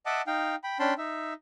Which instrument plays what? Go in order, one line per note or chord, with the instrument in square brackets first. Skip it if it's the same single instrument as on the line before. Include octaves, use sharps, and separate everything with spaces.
[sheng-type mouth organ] D#5 E5 F#5 A5 D6
D#4 F5 G5
G5 B5
C#4 D4 G5 A5 B5 C6
D#4 E5